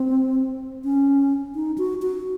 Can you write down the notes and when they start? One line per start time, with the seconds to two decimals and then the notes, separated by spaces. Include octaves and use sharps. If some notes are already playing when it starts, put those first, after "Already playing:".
Already playing: C4
0.84 C#4
1.55 D#4
1.78 F#4
2.02 F#4